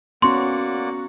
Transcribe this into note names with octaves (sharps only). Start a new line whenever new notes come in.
A#3 B3 C#4 F#4 D5 F#5 C6 C#6